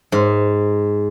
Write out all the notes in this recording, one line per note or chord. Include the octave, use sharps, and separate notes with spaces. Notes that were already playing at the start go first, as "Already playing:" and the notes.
G#2